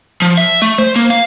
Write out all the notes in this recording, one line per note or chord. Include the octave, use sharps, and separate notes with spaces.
F3
E5
A3
C5
A#3
F5